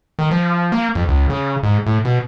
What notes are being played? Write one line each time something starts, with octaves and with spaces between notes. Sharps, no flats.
D#3
F3
A#3
F2
C#2
C#3
G#2
A2
B2